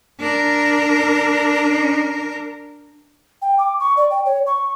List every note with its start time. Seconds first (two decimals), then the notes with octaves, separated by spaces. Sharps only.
0.20 D4 A#4
3.42 G5
3.58 D6
3.80 C#6
3.97 D5
4.11 G5
4.25 C#5
4.47 C#6